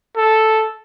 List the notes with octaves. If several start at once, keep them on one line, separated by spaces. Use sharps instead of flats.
A4